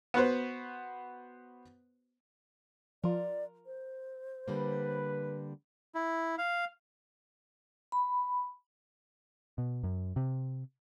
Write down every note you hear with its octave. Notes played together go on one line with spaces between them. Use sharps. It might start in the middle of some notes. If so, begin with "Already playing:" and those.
B3 F#4 B4 C5
F3 F4 A#4 D5
C5
D3 G3 A#3 B4
E4
F5
B5
B2
F#2
C3